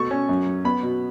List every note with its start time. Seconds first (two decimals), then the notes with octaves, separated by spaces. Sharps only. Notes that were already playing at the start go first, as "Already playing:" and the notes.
Already playing: B2 A3 C#6
0.11 C#4
0.29 F#2
0.47 F#3
0.65 B3 B5
0.83 B2